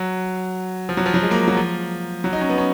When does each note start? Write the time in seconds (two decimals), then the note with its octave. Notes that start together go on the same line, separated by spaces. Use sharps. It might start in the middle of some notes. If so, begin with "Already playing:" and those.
Already playing: F#3
0.89 F3
0.97 F#3
1.06 F3
1.14 F#3
1.23 G#3
1.31 A#3
1.48 F#3
1.56 F3
2.24 F#3
2.33 D#4
2.41 C#4
2.49 B3
2.58 C#4